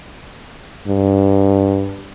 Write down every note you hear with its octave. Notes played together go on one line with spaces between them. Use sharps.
G2